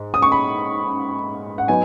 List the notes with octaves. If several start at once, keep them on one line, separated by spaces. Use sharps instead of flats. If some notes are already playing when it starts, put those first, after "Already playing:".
Already playing: G#2
D#6
C#6
B5
F#5
F#3 B3 D#4 G#5